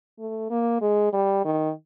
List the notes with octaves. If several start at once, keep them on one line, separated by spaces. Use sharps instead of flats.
A3
A#3
G#3
G3
D#3